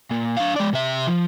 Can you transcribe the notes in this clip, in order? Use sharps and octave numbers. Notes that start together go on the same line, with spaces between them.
A#2
D4 F5
G#3 D5
C3 E5
F3